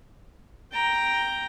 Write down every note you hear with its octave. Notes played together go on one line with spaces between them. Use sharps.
G5 A#5